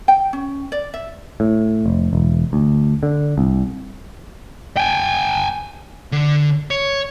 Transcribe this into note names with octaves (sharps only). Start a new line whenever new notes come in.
G5
C#4
D5
E5
A2
F1
E1
D2
D3
C2
G5 G#5
D3
C#5